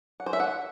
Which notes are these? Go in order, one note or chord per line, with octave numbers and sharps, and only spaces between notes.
F#5
C5
E5
F#5